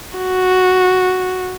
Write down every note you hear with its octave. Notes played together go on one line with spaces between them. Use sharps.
F#4